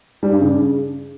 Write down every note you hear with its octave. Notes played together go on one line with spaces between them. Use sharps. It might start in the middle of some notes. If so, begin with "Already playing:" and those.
G3
G2
C#3